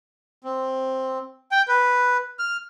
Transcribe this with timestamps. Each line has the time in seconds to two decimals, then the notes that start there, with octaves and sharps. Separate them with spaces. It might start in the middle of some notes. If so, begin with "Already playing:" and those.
0.44 C4
1.51 G5
1.68 B4
2.39 F6